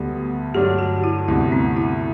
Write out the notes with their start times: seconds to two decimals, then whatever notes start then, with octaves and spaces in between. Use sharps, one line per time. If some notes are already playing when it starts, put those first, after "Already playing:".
Already playing: D2 D3 G3 B3
0.54 G2 D3 F#3 A3 D4 G4
0.79 F#4
1.04 E4
1.28 D2 C3 G3 B3 E4
1.52 C4
1.76 E4